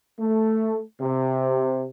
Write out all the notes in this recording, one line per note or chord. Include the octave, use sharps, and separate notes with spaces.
A3
C3